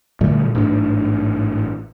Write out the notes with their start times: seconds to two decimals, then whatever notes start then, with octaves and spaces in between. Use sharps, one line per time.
0.21 A#2 D3 G3 A3
0.55 A1 G#2 D4